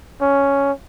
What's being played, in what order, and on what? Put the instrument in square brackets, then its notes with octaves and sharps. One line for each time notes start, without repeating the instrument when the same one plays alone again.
[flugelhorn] C#4